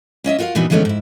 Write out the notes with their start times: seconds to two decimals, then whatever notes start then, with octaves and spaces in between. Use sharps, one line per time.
0.24 A#3 C#4 D#5 E5
0.39 F4 F#4 A#4 D#5 F5
0.55 A#2 E3 B3 D4 D#4 F#4
0.70 D3 E3 G#3 A3 B3 C#4
0.85 G#2 E4